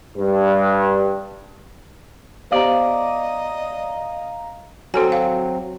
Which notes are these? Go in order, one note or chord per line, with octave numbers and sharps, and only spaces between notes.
G2
B3 G4 C5 D5 D#5 F5 A#5
F#3 C4 F#4 A4 G#5
F5